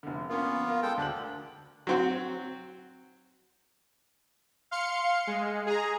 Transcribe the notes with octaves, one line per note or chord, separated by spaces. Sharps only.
F1 D3
A#3 B3 C#4 F4
A#4 F5
G#3 A4 G5
D2 D4 F#7
F#3 C4 F#4
F5 C6 C#7
G#3
G#4 A#5